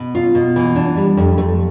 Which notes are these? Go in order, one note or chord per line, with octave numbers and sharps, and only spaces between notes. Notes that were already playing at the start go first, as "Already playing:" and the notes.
Already playing: B2
F4
B2
E3
D4
G3
F2
A3